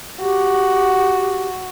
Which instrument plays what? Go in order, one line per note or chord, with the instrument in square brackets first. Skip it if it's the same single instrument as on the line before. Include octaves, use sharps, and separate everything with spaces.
[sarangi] F#4 [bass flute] G4